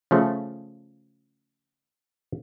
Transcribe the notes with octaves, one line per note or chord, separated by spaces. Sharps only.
C#3 F3 A3